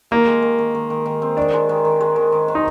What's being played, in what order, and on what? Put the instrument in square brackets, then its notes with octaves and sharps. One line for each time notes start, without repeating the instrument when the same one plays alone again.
[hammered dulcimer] D#3 [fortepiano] A#3
[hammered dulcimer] G#3
D#3
D#3
D#3
D#3
D#3
C4
[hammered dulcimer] D#3 [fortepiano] D4
[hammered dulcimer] G#3
D#3
D#3
G#3
D#3
D#3
D#3
[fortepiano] D#4